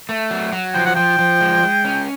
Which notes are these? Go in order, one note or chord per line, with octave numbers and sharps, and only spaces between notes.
A3
F#3
F#3
F3 G5
F#5
F3 G5
F3
G#3
G#3
C#4